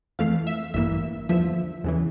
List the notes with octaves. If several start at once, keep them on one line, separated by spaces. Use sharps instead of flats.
F2 E3 A3 F5
E5
A1 G2 E3 A#3 E5
E2 D3 F3 E5
E2 C#3 E3